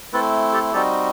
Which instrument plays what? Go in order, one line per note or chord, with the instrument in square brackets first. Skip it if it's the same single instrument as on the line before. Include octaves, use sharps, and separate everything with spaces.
[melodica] A3 C4 E4 A4 B4
G4 A4
G3 C4 D#4 F#4 G4 A4